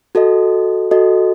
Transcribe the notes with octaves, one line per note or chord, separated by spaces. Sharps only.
F#4 A4 D#5
F#4 A4 D#5